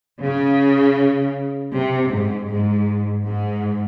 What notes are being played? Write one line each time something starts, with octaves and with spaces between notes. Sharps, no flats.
C#3
C3
G#2
G#2
G#2